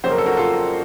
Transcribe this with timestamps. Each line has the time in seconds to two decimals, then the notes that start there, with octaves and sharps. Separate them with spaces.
0.04 F2 C#3 F#3 A#3 C5
0.11 A#4
0.18 A4
0.26 F#4 A#4
0.37 F4 A4